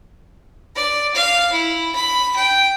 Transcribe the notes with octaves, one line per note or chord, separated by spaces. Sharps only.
D5
F5
E4
B5
G5